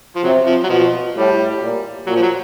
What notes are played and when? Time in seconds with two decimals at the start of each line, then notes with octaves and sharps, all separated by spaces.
0.16 F3
0.23 C3 F#3
0.47 F3
0.64 F#3
0.69 B2 F3
1.15 A2 G3
1.61 A#2
2.07 A#2 F#3
2.16 F3
2.22 F#3